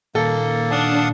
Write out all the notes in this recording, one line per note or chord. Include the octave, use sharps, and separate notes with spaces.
A#2 D#3 A#3 A4
D4 F5 F#5 D#6